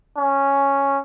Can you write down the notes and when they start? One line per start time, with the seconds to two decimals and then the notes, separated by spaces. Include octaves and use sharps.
0.17 C#4